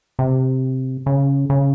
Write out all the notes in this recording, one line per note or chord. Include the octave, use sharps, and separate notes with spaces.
C3
C#3
C#3